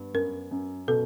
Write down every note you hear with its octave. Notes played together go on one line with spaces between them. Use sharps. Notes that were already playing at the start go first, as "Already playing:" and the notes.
Already playing: G2 B3
F#2 A#4
F#2
B2 A4